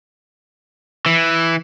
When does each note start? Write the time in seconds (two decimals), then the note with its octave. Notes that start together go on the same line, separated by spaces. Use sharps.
1.06 E3